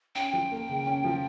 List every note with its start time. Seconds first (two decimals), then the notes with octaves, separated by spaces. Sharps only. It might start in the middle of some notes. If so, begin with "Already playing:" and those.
0.15 C#4 G5
0.33 F3
0.51 A#3
0.69 C#3
0.86 C#4
1.04 F3